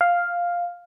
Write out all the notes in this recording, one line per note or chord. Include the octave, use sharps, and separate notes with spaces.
F5